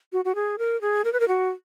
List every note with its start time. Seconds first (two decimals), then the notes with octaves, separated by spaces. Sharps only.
0.13 F#4
0.25 F#4
0.35 G#4
0.59 A#4
0.81 G#4
1.04 A#4
1.13 B4
1.20 A#4
1.28 F#4